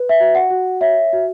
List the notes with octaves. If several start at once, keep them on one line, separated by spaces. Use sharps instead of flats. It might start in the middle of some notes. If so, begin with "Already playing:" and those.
Already playing: B4
E5
F#4
F#5
F#4
C#5 E5
F#4